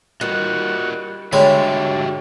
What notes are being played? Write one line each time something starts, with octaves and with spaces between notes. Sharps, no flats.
G3 F4 F#4 A#4 D#5
D3 G3 G#3 F#4 G4 C#5 E5 B5